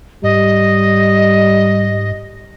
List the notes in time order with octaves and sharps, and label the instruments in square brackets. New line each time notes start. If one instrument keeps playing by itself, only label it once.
[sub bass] G#2 [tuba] G3 [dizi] D#5